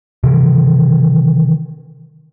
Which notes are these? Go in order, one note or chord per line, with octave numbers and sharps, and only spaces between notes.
C3 D#3 E3